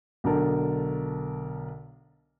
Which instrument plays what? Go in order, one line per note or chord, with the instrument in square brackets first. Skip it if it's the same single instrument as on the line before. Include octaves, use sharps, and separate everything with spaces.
[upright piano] B1 D3 D4 A#4 A5